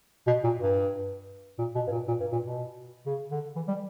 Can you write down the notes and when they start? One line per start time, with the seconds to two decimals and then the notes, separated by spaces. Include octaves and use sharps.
0.27 B2
0.44 A#2
0.61 G2
1.59 A#2
1.76 B2
1.87 G2
1.92 A#2
2.08 A#2
2.20 G2
2.32 A#2
2.44 B2
3.06 C#3
3.32 D3
3.56 E3
3.68 G3